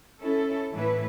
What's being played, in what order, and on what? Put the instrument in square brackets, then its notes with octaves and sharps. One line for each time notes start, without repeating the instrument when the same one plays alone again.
[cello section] C#4 E4 A4
A2 E3 A3 E4 B4